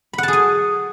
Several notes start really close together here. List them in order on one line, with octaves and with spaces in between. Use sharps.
B5 F#5 A5 G#4 G#5